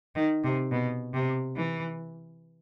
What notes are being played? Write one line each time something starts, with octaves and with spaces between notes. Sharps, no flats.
D#3
C3
B2
C3
E3